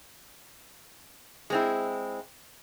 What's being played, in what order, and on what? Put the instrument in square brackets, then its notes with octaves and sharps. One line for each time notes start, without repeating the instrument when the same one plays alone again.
[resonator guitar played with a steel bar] G#3 C4 E4